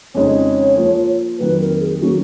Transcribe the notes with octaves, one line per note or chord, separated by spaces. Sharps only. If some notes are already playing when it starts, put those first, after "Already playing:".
F2 C#3 G#3 D#4 C#5
F3 A#3 F4
F2 D#3 F#3 A#3 B4
A#4
G#4
D#3 F#3 A#3 C#4 F#4